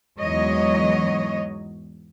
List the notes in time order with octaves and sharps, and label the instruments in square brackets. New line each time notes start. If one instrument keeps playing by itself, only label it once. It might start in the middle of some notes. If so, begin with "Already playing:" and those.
[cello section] E2 G#2 F#3 C#5 D#5